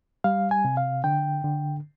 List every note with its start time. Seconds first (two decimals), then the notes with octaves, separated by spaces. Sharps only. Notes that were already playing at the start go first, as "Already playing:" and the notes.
0.24 G3 F5
0.51 G#5
0.65 C3
0.77 F5
1.04 D3 G5
1.44 D3